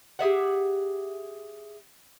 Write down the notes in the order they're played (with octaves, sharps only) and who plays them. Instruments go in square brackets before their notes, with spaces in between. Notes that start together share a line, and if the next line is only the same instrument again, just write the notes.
[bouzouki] G4 G#4 E5 F#5